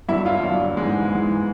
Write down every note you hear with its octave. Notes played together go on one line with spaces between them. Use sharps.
G2 D3 F#3 E4 E5
F4 F5
G2 D3 F#3
G#2 E3 G#3
G#2 E3 G#3